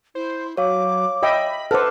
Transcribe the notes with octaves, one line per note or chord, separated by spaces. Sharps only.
E4 C5
F#3 C#5 F5 D6
D#5 E5 G5 B5
A4 B4 C5 F#5 D6 F6